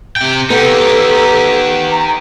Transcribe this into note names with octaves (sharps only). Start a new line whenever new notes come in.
C3 G5
B3 D#4 G4 A4
A#5